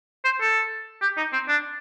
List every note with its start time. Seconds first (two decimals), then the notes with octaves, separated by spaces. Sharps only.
0.25 C5
0.41 A4
1.02 G4
1.17 D#4
1.33 C4
1.48 D4